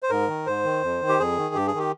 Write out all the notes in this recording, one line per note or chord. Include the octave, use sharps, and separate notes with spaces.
C5
G#2 A#4
D#3
G#2 C5
D#3
F2
D#3
G4
F2 G#4
D#3
G2 G4
G#4
D#3 G4